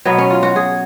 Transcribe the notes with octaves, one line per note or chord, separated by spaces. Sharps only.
B2 F#3 B3
C#4
F4
F#4
G#4